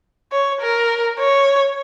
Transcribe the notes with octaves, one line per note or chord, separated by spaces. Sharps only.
C#5
A#4
C#5